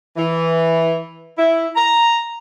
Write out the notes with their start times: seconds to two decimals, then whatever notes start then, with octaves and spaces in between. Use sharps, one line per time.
0.17 E3
1.38 E4
1.76 A#5